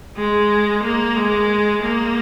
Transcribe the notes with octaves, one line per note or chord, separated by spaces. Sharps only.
G#3
A#3
G#3
A#3